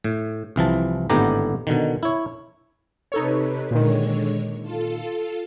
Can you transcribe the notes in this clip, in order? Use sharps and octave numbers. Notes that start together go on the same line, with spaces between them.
A2
C2 E3 F3 A5
G#1 A2 D3 B3 G4 A#5
B2 D3 D#3
E4 C#5
C3 D#4 A4 B4 C#5
A#2 D3 D#3 G#3 C#5
F4 A4